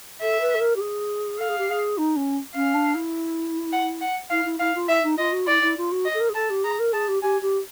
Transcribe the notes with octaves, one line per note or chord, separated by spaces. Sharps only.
A4 E5
B4
A4
A#4
G4
G#4
A4 F5
G#4
G4
G#4
D#4
C#4
C#4 F5
D4
E4
F#5
F#5
E4 F5
E4
E4 F5
F4
E4 E5
D#4
F4 D#5
F#4
E4 D5
E4
F4
F#4
D#5
A4
A#4
G#4
A4 A5
G4
G#4 A#5
A#4
G#4 A5
G4
G4 G#5
G4